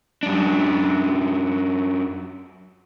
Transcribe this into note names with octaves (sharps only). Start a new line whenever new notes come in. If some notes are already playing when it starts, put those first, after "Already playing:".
F#2 D4